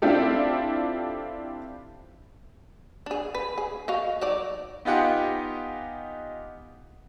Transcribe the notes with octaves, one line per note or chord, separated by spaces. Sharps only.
C4 D4 E4 F4 G4 A4
D4 G#4
B4
G#4
F#4 D#5 F5
F#3 D#4 D5
B3 D#4 F4 G4 F#5 G#5